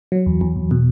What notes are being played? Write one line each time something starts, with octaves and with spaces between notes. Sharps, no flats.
F#3
E2
E2
E2
B2